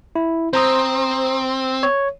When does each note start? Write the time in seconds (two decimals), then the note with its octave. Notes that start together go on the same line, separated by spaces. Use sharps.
0.15 E4
0.53 C4 C5 A#5 D#6
1.83 C#5